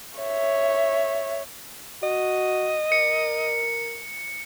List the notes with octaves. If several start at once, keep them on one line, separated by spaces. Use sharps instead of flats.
C#5 E5
F#4 D#5
A#4 C#7